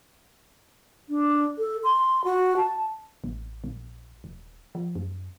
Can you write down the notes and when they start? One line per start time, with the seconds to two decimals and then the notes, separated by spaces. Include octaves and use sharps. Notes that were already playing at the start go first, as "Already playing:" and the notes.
1.09 D4
1.58 A4
1.84 C6
2.25 F#4
2.57 A5
3.24 A1
3.64 A#1
4.24 D#1
4.75 F3
4.95 F#2